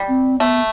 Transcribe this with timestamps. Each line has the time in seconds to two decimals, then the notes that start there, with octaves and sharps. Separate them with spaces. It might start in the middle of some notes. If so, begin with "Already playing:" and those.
Already playing: G3
0.08 C4
0.40 A3 B3